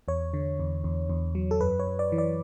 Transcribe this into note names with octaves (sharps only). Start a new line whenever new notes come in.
E2 C#5
D3
E2
E2
E2
F#3
A4
F#2 B4
C#5
F#2
D5
E3
D5